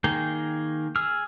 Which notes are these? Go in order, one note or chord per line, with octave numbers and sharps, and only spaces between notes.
D#3 A#3 G#4 G5
G#4 E6 F6